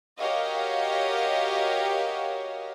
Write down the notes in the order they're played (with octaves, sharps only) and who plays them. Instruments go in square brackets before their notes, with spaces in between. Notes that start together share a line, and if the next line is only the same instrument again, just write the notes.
[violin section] F#4 G4 A#4 C#5 D#5 F5